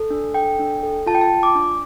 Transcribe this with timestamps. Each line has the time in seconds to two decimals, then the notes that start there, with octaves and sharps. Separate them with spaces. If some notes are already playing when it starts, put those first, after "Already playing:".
Already playing: A4
0.10 D4
0.34 A4 G5
0.60 D4
0.83 A4
1.06 F4 A5
1.15 G5
1.21 A5
1.30 F4
1.43 D6
1.55 D4